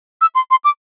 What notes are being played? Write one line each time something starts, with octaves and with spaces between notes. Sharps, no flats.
E6
C6
C6
D6